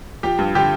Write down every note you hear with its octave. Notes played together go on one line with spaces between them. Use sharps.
F3 G4 G5
G2
D3 G4 G5